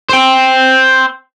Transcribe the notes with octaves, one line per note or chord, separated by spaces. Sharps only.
C5 G5